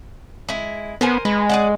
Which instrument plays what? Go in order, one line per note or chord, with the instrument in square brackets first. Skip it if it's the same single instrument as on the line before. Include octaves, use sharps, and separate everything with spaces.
[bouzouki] G#3 E4
[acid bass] B3 [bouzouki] A#4 C5 G#5
[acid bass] G#3 [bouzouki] B4
[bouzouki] G#4 D5 F#5